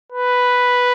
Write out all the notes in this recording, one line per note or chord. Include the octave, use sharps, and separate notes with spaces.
B4